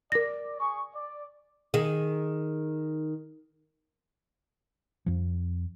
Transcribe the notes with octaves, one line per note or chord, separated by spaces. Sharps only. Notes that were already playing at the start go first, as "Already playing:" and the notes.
A#4 D5 A#6
G#4 C#6
D5
D#3 G#4
F2 F3